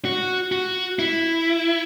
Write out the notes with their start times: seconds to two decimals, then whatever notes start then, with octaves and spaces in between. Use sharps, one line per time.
0.05 F#4
0.52 F#4
0.99 E4